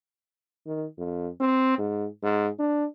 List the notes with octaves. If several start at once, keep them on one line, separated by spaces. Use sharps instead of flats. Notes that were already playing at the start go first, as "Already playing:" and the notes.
D#3
F2
C4
G#2
G#2
D4